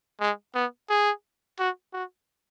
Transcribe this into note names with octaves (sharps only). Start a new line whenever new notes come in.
G#3
B3
G#4
F#4
F#4